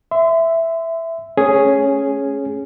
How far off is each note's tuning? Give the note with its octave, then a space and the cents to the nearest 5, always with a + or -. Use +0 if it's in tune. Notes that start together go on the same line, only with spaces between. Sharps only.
E5 +0 C6 -35
A3 +0 C#4 +0 G#4 +0